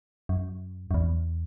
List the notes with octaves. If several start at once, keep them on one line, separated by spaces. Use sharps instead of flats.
F#2
F#2
E2